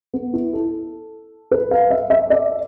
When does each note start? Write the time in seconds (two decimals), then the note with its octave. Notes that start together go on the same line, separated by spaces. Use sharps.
0.13 B3
0.33 E4
0.53 A4
1.51 B4
1.71 F5
1.90 E5
2.10 E5
2.30 D5